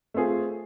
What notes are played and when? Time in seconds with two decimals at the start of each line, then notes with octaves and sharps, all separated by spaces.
0.14 A3 C4 F4 G#4